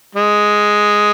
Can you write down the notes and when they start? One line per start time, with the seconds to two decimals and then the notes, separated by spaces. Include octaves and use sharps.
0.15 G#3